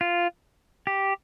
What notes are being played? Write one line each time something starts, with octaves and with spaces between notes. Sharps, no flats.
F4
G4